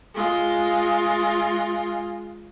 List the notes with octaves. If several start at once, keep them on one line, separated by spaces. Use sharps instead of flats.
G#3 F4